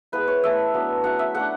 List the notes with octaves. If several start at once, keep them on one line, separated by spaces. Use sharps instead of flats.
G#3 B3 E4 B4
C#5
A3 E4 E5
F#3 B3 D4
F#3 C#4 E4 F#5
E5
A3 D4 F#5